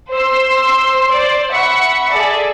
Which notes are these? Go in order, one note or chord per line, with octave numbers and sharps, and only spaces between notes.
C5 C6 E6
C5 D5
E5 F#5 B5 C#6 C#7
G#4 A4 D5 E5